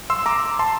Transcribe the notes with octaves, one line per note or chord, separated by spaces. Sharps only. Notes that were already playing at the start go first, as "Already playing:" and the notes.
C6 E6
A#5 D6
A5 C6